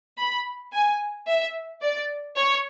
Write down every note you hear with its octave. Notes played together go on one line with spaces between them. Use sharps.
B5
G#5
E5
D5
C#5